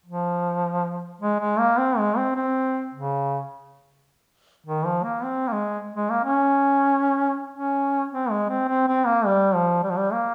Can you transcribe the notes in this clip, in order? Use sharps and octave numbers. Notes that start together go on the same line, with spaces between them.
F3
G#3
G#3
A#3
C4
G#3
C4
C4
C#3
D#3
F3
A#3
C4
A#3
G#3
G#3
A#3
C#4
C#4
C4
G#3
C4
C4
C4
A#3
G3
F3
G3
F3
G3
A#3